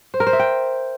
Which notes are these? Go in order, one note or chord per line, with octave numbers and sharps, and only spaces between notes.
C5
A#4
C5
E5
G5